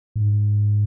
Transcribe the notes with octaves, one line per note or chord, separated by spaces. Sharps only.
G#2